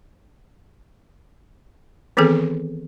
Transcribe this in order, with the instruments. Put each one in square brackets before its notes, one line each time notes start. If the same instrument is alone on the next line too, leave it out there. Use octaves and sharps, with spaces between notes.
[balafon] D#3 E3 B3 C4 G#4 A4